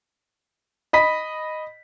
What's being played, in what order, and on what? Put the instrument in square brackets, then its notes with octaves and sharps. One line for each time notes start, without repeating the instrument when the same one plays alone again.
[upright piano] D#5 B5 B6